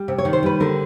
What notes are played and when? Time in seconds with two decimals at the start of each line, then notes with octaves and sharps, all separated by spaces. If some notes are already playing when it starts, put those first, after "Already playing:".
Already playing: G3
0.08 C3
0.18 C#5
0.25 D#3
0.33 C5
0.43 G3 B4
0.60 D3 A#4